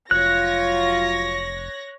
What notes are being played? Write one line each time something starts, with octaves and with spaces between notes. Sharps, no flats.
F1 F#3 F4 C#5 F#6 A#6